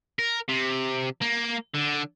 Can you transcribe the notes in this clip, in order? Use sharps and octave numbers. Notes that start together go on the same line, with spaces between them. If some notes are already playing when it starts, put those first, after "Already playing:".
A#4
C3
A#3
D3